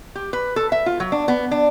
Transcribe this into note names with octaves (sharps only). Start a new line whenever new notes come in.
G4
B4
A4
E5
F4
F#3
D4
B3
D4